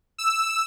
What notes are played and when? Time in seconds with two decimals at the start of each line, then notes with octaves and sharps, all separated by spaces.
0.18 E6